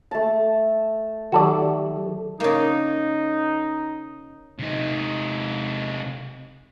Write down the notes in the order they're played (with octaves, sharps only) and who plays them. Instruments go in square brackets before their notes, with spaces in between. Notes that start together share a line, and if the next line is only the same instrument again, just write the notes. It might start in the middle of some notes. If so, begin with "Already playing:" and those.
[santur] A3 A5
[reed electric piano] D#3 F#3 G4 [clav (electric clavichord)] F#4 A4 D5
[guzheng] C#3 A#3 [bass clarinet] D#4
[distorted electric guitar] C3 D#4